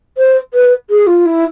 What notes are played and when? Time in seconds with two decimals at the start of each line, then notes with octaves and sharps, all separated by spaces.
0.17 C5
0.53 B4
0.90 G#4
1.07 F4
1.25 E4